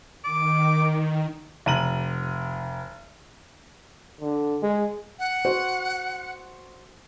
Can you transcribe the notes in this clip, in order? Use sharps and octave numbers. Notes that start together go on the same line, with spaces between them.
D#3 D6
F1 A#5 D#7 F#7
D3
G#3
F#5
F#4 C5